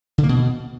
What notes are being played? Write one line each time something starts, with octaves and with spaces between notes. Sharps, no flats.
D3
A#3
B2